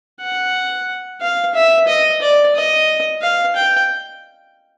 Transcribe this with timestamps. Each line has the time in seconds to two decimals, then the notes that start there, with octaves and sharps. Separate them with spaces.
0.21 F#5
1.21 F5
1.55 E5
1.87 D#5
2.21 D5
2.55 D#5
3.22 F5
3.56 G5